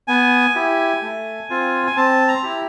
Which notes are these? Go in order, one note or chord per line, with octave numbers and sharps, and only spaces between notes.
B3 G#5
E4 G4
A3
C4 F4
G#5
C4 A5
A#5
E4 G4